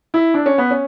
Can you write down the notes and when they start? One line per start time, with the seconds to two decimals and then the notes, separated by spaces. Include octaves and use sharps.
0.14 E4
0.34 D4
0.46 C#4
0.58 B3
0.71 C#4